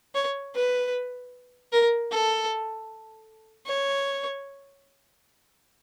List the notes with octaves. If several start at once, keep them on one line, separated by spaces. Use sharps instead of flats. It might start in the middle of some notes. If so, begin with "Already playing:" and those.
C#5
B4
A#4
A4
C#5